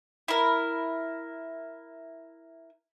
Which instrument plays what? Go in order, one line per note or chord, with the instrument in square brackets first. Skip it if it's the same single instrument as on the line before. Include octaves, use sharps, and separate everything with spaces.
[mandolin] E4 A#4